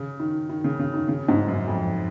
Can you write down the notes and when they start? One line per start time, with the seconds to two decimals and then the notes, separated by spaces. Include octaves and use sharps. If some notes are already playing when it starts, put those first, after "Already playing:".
Already playing: C#3
0.20 D#3
0.50 D#3
0.64 C#3
0.79 C#3
0.94 D#3
1.08 C#3
1.28 G#2
1.48 F#2
1.68 F2